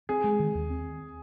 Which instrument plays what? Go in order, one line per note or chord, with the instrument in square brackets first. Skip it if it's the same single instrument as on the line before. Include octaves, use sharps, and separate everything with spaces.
[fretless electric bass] C4 [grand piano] G#4
[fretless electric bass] G#3
D#3
D#2
C4